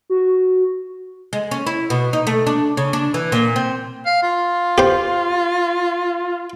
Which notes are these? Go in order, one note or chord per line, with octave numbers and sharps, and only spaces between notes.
F#4
G#3
C#4
E4
B2
D#4
A3
D4
C#3
D4
E3
A#2
C4
F5
F4
G4 C5